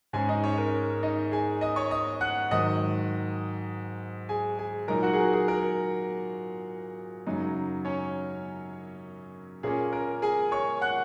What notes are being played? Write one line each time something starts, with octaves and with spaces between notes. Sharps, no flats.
G#2 G#3 C#4 G#4 G#5
D#4 D#5
C#4 C#5
A#4
D#4 D#5
G#4 G#5
D#5 D#6
C#5 C#6
D#5 D#6
F#5 F#6
G#2 D#3 F#3 D#5 D#6
G#4 G#5
G#4 G#5
A#2 F#3 D#4 A#4 A#5
F#4 F#5
G#4
A#4
G#4
A#4
F#2 C#3 F#3 D#4
C#4 C#5
A#2 A#3 C#4 G#4
A#4
G#4 G#5
C#5 C#6
F#5 F#6